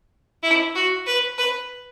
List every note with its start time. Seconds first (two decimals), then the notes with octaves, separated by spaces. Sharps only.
0.43 E4
0.75 F#4
1.07 B4
1.38 B4